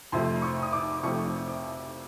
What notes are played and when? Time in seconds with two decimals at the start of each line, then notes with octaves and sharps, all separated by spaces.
0.12 F2 C3 F3 A3 C6
0.42 C#6
0.62 D#6
0.73 D6
1.03 F2 C3 F3 A3 C#6
1.48 D6